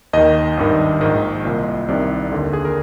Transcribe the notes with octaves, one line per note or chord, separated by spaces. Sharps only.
D#2 D#3 D#5
G#1 G2 D#3
A#1 G#2 D#3 D#5
C2 A#2
C2 C3 D#3 D5
D#2 D3
G#4
A#4